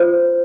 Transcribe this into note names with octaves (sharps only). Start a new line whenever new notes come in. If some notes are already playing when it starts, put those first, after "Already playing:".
Already playing: F4 C5